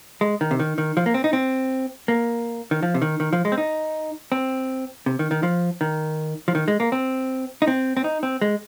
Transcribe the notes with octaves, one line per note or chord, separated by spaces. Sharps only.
G#3
D#3
C3
D#3
D#3
F3
A#3
C4
D#4
C4
A#3
D#3
F3
C3
D#3
D#3
F3
G#3
C4
D#4
C4
C3
D#3
D#3
F3
D#3
F3
D#3
G#3
A#3
C4
D#4
C4
C4
D#4
C4
G#3